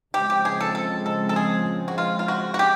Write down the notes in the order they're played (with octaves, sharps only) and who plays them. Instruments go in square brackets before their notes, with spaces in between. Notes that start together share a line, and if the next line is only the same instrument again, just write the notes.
[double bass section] C#3 F3 G#3 C4 [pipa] G4
[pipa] G4
G#4
A4
A4
A4
A4
G#4
F#4
F4
F4
F#4
F#4
G4